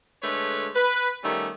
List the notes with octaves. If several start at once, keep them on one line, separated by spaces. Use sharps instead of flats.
D3 G#3 A3 B4 C#5
B4
D#3 G3 A3 B3 C#4